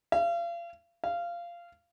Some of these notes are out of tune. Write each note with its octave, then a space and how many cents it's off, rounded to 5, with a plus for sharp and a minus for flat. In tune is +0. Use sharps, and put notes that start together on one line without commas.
F5 -35
F5 -15